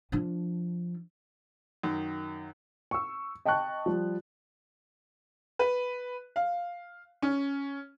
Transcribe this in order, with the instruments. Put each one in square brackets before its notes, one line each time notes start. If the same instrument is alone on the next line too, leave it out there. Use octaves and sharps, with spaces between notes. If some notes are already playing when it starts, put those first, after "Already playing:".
[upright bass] F3 D4
[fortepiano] F#2 D#3
[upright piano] C#6 E6
D#5 G5 A5 C#6 F#6
F3 G3
B4
F5
C#4